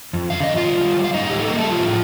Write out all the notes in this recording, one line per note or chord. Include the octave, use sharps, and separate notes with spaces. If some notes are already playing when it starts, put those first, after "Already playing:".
F2
D3 F5
F2 D#5
F4 F5
G3
G3
G3
F5
A2 D#4 D#5
A2 G4
A4
G3 A#3 A#4
A3 A4
G3
F3 F4
A2